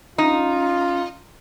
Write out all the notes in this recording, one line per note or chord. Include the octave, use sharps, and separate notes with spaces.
C#4 D#4 F4